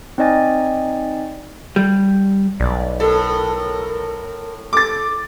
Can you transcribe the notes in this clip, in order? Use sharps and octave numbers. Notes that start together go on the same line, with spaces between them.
C4 D#4 D5 D#5 G#5 A6
G3
B1 D5
A2 A4 A#4
A4 D6 A6